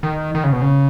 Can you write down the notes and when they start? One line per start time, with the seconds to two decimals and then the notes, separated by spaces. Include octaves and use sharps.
0.03 D#3
0.35 D#3
0.44 C#3
0.53 B2
0.62 C#3